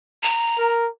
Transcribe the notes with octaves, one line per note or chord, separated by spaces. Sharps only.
A#5
A#4